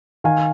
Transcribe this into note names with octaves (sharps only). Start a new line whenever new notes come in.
D#3 F5 G#5